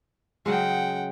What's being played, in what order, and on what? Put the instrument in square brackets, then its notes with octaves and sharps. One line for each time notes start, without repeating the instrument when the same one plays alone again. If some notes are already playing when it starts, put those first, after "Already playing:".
[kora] C#3 F#3 G#3 [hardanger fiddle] F#5 G5